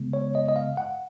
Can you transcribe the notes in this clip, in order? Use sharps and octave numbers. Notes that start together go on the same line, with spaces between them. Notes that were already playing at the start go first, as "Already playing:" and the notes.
Already playing: C#3 G#3 B3
C#5
D#5
D#5
F5
F#5